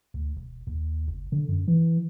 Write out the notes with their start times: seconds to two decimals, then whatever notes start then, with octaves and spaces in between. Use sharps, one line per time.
0.14 D2
0.37 E1
0.67 D#2
1.08 F#1
1.32 D3
1.49 F#2
1.68 E3